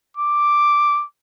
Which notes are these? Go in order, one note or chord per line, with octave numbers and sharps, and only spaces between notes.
D6